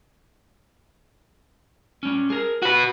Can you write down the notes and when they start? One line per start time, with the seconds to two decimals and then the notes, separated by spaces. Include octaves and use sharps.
2.03 G3 C#4
2.30 G#4 A#4
2.62 F#4 B4 F#5